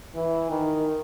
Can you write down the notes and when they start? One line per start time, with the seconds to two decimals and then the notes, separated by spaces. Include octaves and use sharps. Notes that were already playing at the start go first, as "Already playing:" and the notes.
0.15 E3
0.50 D#3